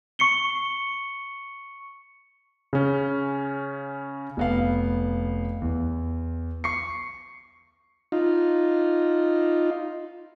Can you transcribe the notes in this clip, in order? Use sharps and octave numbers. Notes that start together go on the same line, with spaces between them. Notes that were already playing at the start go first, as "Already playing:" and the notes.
C#6 C7 C#7 G7
C#3 C#4
F1 B3 F5
E2
C#6 C7 C#7
D#4 F4